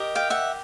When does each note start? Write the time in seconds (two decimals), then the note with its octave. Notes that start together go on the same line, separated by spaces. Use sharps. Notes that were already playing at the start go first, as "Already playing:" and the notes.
Already playing: G4 A#4 D#5
0.15 F5 G5
0.30 E5 F#5